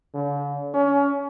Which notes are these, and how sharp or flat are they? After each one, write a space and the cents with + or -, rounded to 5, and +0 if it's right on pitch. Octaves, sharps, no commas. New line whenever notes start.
D3 -45
C#4 +25